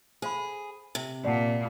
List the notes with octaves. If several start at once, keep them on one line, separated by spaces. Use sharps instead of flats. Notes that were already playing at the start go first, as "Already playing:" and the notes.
G#4 C5 F5 B5
C3
A#2 D5 F#5 A5